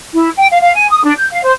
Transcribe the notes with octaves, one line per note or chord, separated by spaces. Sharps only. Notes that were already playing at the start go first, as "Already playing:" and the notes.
E4
G5
F5
F5
G#5
D#6
D4
G6
F5
C5